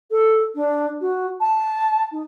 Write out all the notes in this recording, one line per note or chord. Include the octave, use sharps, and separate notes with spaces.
A4
D4
F#4
A5
D#4